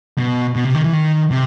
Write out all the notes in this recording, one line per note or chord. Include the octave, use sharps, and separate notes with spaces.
B2
B2
C3
D#3
E3
D#3
C3